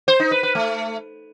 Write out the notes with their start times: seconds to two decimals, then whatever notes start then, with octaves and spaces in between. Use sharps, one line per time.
0.08 C5
0.20 D#4
0.31 B4
0.43 B4
0.55 A3